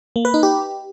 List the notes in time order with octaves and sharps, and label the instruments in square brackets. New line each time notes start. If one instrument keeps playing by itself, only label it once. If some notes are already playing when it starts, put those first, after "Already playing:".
[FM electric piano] A#3
B4
D#4
G4